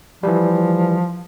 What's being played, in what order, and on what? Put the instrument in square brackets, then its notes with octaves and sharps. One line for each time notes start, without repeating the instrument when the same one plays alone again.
[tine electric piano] E3 G3 [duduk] F3